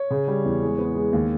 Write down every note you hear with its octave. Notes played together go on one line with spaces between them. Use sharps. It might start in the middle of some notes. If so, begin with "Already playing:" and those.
Already playing: C#5
C#3
G3
E2
G#3
B3
G#3
D#2